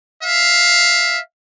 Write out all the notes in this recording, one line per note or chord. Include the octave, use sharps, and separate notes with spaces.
E5 F5